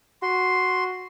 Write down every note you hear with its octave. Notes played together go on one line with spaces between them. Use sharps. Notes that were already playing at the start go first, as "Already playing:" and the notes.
F#4 C6